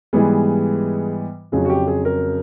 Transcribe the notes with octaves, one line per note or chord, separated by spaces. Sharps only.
G#2 E3 G3 B3 G#4
F2 C#3 F#3 G#4
F#4
G4
G#4
A#4